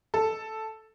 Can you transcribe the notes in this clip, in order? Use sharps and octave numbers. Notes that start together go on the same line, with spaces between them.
A4